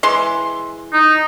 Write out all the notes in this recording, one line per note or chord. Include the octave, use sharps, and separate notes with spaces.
E3 G#3 C6
D#4